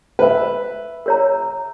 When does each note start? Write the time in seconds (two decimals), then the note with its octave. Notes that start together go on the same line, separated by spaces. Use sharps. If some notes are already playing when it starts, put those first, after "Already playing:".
0.19 B4 E5
1.06 A#4 C#5 A#5